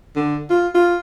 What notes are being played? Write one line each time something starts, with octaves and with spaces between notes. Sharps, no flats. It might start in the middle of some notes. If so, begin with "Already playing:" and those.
D3
F4
F4